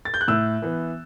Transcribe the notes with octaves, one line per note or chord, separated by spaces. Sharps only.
A6
G6
F#6
A2 E6
E3 B3